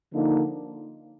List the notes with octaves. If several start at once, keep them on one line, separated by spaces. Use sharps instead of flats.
D3 F3 A#3 D#4